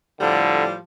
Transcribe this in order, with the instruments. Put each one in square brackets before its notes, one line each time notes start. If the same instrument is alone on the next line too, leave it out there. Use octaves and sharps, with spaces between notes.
[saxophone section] A2 F3 G3 [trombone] D3